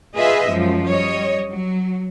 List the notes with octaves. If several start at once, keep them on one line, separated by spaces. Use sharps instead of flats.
F4 G#4 B4 D#5 E5
F#2 F3 G#3
G3 C#5 D#5
F#3